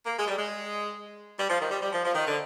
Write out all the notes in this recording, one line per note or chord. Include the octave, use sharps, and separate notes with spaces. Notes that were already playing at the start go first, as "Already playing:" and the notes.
A#3
G#3
G3
G#3
G3
F3
D#3
G3
G3
F3
F3
D#3
D3